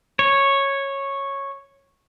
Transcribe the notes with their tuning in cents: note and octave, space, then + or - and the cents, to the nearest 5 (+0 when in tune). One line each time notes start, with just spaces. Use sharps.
C#5 -10